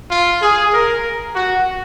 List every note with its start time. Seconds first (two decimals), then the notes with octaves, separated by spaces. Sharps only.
0.11 F4
0.42 G#4
0.74 A#4
1.35 F#4